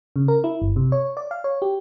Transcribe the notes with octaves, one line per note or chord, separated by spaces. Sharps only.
C#3
A#4
E4
G1
C3
C#5
D5
F5
C#5
G4